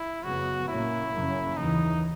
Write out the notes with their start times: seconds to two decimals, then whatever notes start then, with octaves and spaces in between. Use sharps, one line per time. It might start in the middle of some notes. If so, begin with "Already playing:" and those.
Already playing: E4
0.24 F#2 C#3 F#3 B3 F#4
0.68 A#2 A#3 C#4 E4
1.12 F#2 C#3 F#3 A#3 C#4
1.56 D#2 C#3 E3 D#4